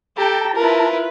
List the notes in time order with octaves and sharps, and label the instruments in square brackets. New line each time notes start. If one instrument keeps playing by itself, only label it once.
[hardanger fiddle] G4 [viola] A4 G5 [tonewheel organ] A5 A#5
[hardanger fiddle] E4 A#4 [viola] F4 B4